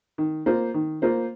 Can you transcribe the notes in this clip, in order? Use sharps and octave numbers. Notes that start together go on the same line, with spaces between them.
D#3
A#3 F4 C5
D#3
A#3 F4 C5